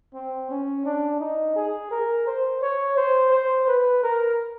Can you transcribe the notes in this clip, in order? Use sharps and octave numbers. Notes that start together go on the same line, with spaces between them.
C4
C#4
D4
D#4
G#4
A#4
C5
C#5
C5
C5
B4
A#4